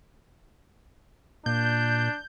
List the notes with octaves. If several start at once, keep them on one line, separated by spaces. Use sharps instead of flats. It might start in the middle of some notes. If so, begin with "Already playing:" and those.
A#2 D4 G6